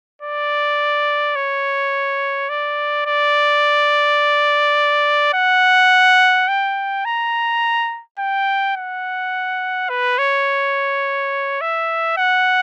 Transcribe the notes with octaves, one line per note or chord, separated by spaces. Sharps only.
D5
C#5
D5
D5
F#5
G5
A#5
G5
F#5
B4
C#5
E5
F#5